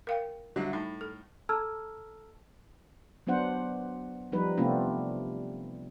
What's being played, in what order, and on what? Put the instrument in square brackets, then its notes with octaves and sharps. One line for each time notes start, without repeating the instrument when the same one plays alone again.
[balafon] A#4 F5 G5
[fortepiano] D3 F#3 [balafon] G3 E5
[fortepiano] A2 [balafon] D#4
[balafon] A4
[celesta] A4 A5 A#5 E6 F6 G#6
[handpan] F#3 B3 D4 C5 F#5
F3 G3 D#4 B4
C3 A3 B3 C4 D4 F4